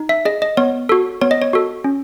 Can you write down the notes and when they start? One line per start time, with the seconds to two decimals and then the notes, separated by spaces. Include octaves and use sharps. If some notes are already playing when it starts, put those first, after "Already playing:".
Already playing: D#4
0.09 E5
0.25 G#4 D#5
0.42 D#5
0.57 B3 C#5
0.89 F#4 A4
1.21 B3 C#5
1.31 D#5
1.42 C#5
1.53 F#4 A4
1.84 C#4